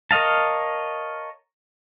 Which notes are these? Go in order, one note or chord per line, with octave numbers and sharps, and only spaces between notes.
A#4 C#5 D#5 F5 A5